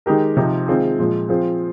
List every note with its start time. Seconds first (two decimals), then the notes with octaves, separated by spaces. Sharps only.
0.06 D#3 G#3 D#4 G4 A#4
0.37 C3 F3 C4 D#4
0.68 D#3 G#3 C4 F4 G#4
0.99 A#2 F3 G#3
1.29 F3 C4 F4 G#4 C5